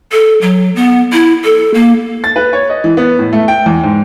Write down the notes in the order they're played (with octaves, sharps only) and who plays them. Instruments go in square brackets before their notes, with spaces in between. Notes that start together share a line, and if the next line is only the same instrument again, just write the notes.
[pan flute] A4
F#3
B3
E4
A4
A#3
[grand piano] A6
B4
C#5
D#5
E3
B3
A2
A3
G5
E2
G#2